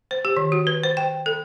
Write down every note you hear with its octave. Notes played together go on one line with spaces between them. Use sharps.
C5
G4
D#3
F#4
B4
C5
G5
A4